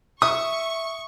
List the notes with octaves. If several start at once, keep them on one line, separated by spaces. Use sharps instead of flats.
E5 C#6 D#6